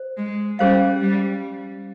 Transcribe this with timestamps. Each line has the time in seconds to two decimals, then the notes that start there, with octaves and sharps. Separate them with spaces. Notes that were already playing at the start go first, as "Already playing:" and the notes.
Already playing: C5
0.18 G#3
0.59 G3 C#4 G#4 C5 F5
1.01 G3